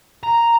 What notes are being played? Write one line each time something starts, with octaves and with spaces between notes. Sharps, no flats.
A#5